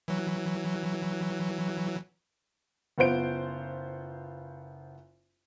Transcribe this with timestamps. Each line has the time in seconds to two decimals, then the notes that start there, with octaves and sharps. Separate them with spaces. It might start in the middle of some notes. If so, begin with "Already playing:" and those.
0.08 E3 F#3
2.98 F#1 B3 F4 C5 D7